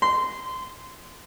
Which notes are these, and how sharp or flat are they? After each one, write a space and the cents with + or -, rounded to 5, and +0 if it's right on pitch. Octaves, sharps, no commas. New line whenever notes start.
C6 -20